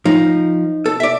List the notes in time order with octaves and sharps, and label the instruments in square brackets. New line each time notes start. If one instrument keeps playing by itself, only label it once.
[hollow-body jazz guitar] F3 [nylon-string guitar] D#4
[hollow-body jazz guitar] A4
D5 E5